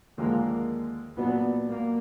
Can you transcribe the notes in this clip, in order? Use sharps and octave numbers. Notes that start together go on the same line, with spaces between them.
D#2 D3 F3 G#3 A#3
A#2 F#3 B3 D4
A#3